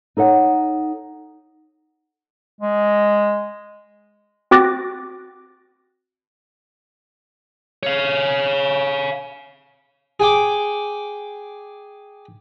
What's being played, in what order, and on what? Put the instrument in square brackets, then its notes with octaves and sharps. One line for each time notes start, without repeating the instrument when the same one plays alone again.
[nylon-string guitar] D#4 A4 C#5 F#5
[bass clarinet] G#3
[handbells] C4 F#4 D6 F#6 A6 A#6
[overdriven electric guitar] C#5 F5
[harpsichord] G#4 G5 D6